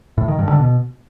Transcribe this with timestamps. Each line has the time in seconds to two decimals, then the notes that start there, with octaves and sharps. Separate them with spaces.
0.18 A2
0.28 D#3
0.39 G2
0.49 D3
0.60 B2